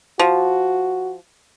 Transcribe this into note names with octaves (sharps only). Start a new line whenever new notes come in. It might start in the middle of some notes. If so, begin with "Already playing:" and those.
F3 F#4